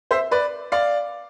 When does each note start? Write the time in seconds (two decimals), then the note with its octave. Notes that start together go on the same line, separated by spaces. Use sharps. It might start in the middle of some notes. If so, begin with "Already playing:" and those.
0.11 C5 E5
0.31 B4 D5
0.72 D5 F5